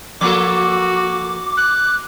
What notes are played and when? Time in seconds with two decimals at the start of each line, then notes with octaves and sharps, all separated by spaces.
0.21 F3 A#3 F#4 A4 D6
1.57 F#6